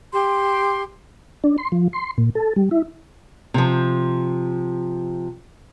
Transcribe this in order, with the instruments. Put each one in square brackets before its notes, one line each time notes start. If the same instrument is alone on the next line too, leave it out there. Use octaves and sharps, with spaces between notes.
[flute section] G4 C6
[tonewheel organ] D4
C6
F3
C6
A#2
A4
G3
E4
[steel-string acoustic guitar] C3 F3